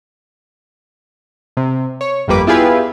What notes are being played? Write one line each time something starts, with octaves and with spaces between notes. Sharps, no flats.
C3
C#5
G1 F2 G3 A#3 B4 D6
B3 E4 F4 G4 G#4 B4